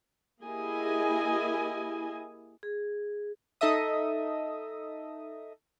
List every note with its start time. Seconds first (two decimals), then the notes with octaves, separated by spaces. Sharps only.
0.44 A#3 E4 G4 G#4 D#5 G#5
2.63 G#4
3.61 D#4 A4 D#5 E5 D#6